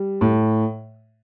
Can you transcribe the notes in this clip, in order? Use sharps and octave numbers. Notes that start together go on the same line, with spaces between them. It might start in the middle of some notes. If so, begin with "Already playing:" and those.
Already playing: G3
A2